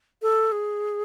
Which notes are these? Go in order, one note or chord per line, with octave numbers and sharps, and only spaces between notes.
A4
G#4